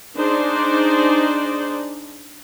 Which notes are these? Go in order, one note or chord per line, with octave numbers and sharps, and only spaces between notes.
D4 D#4 G#4 C5 D5